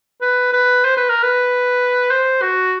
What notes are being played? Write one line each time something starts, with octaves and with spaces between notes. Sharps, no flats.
B4
B4
C5
B4
A#4
B4
C5
F#4